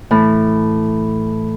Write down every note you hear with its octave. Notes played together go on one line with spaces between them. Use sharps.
A2 E3